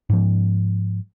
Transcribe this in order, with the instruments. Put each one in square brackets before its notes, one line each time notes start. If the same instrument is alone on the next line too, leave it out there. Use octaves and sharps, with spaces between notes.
[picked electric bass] G#2 F3